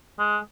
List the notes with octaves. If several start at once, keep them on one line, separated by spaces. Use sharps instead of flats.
G#3